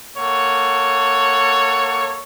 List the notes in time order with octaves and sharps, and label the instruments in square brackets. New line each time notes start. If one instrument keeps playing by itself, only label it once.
[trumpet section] A#3 A4 C#5 F#5